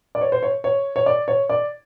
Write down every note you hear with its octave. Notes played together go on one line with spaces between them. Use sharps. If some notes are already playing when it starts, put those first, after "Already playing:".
D5
C#5
C5
C#5
C#5
C#5
D5
C#5
D5